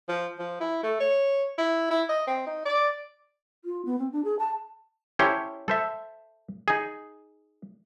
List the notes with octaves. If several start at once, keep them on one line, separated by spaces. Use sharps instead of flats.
F3
F3
E4
A3
C#5
E4
E4
D#5
C4
D#4
D5
F4
B3
C4
D4
G#4
A5
C#4 E4 G4 A4 C5 C#5
A4 C5 E5
D#4 G#4